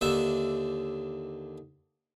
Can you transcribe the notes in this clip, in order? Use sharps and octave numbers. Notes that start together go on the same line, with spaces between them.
D#2 D3 E5